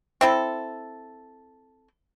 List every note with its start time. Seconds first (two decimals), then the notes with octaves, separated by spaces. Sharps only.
0.21 C4 E4 A4